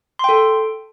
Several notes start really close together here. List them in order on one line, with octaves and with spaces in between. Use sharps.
C6 G5 A4